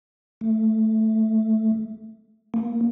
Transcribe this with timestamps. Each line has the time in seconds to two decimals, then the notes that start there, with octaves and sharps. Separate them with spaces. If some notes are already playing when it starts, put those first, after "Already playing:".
0.41 A3
2.54 A#3